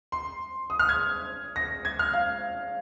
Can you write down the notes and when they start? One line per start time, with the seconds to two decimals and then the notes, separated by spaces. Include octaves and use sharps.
0.12 C6
0.70 D#6
0.79 F6
0.89 G#6
1.56 A#6
1.85 G#6
1.99 F6
2.13 F5